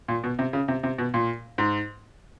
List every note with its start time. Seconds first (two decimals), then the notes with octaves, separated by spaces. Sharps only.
0.08 A#2
0.24 B2
0.39 C3
0.53 C#3
0.68 C3
0.83 C3
0.98 B2
1.14 A#2
1.58 G#2